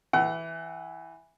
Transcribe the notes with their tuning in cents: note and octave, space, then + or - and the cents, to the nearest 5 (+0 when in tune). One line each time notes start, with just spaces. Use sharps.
E3 +0 F#5 +35